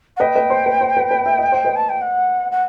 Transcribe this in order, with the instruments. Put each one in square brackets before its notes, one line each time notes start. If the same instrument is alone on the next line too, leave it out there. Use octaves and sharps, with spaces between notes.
[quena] F#5
[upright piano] B4 D#5 [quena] G5
[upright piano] B4 D#5
C5
B4
C5
B4
B4
E5
D#5
C5
B4 D#5
[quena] A5
G5
F#5
F#5